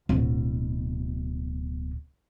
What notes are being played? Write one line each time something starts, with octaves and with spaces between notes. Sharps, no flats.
D1 B2